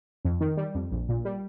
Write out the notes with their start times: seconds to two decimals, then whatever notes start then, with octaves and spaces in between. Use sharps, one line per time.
0.25 F2
0.41 D#3
0.57 G3
0.75 F2
0.91 A#1
1.09 A#2
1.25 G3